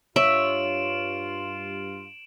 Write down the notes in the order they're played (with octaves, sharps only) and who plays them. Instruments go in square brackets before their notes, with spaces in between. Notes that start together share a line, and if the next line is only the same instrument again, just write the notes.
[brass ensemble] G2 F4 [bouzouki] C#5 [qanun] E5 [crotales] D7 E7 F#7